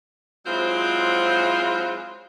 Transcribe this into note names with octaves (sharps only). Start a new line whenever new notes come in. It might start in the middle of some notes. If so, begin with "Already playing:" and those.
F#3 G#3 C4 E4 F4 C5